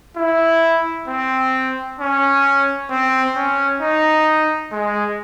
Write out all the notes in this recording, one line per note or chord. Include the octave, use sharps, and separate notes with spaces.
E4
C4
C#4
C4
C#4
D#4
G#3